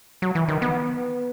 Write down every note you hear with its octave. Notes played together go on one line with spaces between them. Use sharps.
F#3
E3
D#3
B3